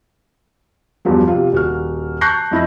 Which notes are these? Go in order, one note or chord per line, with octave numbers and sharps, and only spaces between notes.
E2 G2 F3 F#3
C3 F4
D#1 F#4 F6
A5 C#6 F#6 G6 A#6 C7
F2 E4 D#5 A#6